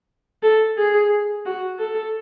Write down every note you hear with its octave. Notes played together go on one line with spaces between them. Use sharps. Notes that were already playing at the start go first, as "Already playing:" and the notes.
A4
G#4
F#4
A4